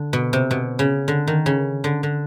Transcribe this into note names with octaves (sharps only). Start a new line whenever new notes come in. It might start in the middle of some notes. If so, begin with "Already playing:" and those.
Already playing: D3
B2
C3
B2
C#3
D3
D#3
C#3
D3
D3